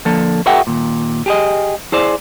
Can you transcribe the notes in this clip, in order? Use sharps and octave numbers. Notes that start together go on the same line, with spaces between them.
D3 F3 A#3 A4
F#4 G#4 A#4 E5 F#5 G5
D#2 A#2
G4 G#4 D#5
E4 G#4 C5 D5